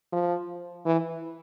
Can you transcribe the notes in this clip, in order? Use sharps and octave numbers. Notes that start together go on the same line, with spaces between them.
F3
E3